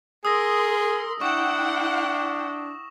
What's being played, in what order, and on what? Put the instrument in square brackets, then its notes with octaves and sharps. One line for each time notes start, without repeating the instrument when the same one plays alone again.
[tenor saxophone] G#4 [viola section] A#4 C6 [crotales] D#6 E6 A#6
[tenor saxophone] D4 [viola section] E4 F#5 G5 [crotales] C#6 E7